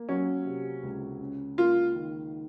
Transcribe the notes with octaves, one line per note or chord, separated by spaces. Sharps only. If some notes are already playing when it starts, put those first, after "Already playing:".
Already playing: A#3
F#3 C#4
C3
C#2
C#4
A#3 F4
D#3